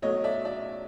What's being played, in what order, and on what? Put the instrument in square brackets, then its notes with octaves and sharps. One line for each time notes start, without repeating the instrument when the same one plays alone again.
[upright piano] B1 B2 F#3 A3 C#5 D#5
D5 E5
D5 E5